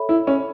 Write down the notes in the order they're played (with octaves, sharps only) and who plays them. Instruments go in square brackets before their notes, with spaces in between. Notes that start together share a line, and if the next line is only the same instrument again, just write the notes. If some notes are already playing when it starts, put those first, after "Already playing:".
Already playing: [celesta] A4 C#5 E5 B5
[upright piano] E4
C#4